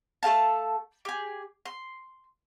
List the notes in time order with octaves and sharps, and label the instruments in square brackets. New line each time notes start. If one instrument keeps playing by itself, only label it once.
[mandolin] A3 A4 F5 A5
G4 G#4
C6